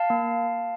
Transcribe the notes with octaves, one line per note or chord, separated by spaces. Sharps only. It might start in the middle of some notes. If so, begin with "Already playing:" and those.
Already playing: F5 A5
A#3